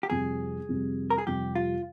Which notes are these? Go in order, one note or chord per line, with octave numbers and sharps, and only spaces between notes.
G4
F2 C3 G3 G#4
F2 C3 G3
A#4
G#4
F2 C3 G3 G4
F4